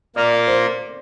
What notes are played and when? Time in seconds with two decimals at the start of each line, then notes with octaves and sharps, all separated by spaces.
0.16 A#2 A#3 F4 A#4 D5
0.47 C5